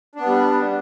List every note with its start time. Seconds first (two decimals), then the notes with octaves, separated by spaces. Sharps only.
0.15 D4
0.20 B3
0.25 G3